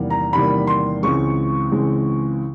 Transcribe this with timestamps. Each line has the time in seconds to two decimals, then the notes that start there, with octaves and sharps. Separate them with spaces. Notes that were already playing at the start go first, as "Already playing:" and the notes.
Already playing: E2 C3 D#3 G3 A#3
0.10 A#5
0.33 E2 C3 D#3 G3 A#3 B5
0.67 C6
1.03 C#2 C#3 E3 G#3 C4 C#6
1.72 C#2 C#3 E3 G#3 C4